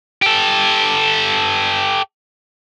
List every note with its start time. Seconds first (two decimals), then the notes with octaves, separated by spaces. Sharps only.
0.22 G4 A4